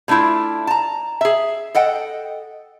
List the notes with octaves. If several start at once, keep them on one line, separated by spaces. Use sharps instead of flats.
B2 A3 D4 E4 F4
A5 A#5
G#4 E5
A4 D#5 F#5 G5